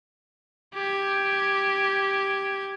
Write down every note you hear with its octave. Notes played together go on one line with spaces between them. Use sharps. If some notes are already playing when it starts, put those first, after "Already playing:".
G4 G#6